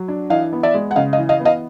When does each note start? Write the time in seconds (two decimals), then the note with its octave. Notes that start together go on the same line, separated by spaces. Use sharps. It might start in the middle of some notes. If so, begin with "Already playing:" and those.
Already playing: F#3
0.08 D4
0.30 E3 D#5 F5
0.53 B3
0.63 D5 E5
0.74 G#3
0.91 F#5
0.96 C#3 D#5 F5
1.13 D#5 F5
1.18 E3
1.29 D#5 F5
1.40 B3
1.45 D#5 F5